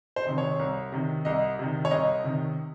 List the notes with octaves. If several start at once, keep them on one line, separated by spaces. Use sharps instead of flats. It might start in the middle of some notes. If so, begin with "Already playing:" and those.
C5
C3 D#3
C#5
C2
C3 D#3
C2 D#5
C3 D#3
C#5
C2 D#5
C3 D#3